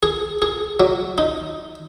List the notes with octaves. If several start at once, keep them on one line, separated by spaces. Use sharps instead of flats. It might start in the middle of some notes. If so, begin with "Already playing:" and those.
G#4
G#4
F#3
D#4